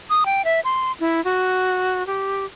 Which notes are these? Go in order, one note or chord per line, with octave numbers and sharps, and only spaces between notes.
D#6
G5
E5
C6
E4
F#4
G4